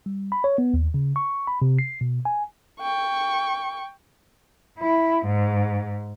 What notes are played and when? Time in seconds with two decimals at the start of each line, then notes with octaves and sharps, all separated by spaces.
0.06 G3
0.32 B5
0.44 C#5
0.58 B3
0.74 D#2
0.94 C#3
1.16 C#6
1.47 B5
1.62 C3
1.79 C7
2.01 B2
2.25 G#5
2.80 G5 C#6
4.78 E4
5.27 G#2